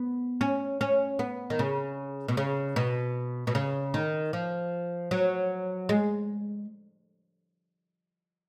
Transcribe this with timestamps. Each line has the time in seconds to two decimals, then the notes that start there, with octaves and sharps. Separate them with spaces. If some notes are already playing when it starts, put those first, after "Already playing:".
Already playing: B3
0.41 C#4
0.81 C#4
1.19 B3
1.50 D#3
1.59 C#3
2.28 B2
2.37 C#3
2.76 B2
3.47 B2
3.55 C#3
3.94 D#3
4.33 F3
5.11 F#3
5.89 G#3